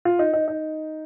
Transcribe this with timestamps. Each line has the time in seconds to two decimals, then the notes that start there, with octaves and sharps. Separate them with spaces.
0.05 F4
0.19 D#4
0.34 D#4
0.48 D#4